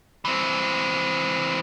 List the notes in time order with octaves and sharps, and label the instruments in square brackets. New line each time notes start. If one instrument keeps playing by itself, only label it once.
[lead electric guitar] E3 C4